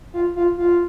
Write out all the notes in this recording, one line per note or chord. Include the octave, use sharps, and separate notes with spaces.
F4
F4
F4